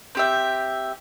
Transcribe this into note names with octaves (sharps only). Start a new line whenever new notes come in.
C4 G4 E5